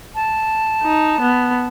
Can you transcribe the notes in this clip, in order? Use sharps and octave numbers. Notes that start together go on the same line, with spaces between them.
A5
D#4
B3